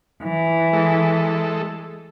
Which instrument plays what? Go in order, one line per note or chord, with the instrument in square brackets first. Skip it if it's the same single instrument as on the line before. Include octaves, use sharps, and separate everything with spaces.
[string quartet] E3
[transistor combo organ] G#3 A4